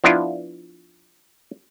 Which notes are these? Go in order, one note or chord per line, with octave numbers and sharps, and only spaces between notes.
F3 B3 D4 E4 F4